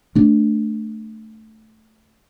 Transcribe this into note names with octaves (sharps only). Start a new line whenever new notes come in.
A3 D4